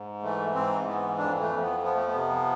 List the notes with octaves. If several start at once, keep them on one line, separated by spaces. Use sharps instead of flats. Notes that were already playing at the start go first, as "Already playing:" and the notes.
Already playing: G#2
E3 A3
G#2 C4
E3 B3
F2 D4
A3
F2
B3
F3 B3
A3
B3
C3